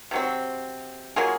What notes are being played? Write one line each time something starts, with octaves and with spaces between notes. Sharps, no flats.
C3 F#3 C4
F#3 A#3 F4 G#4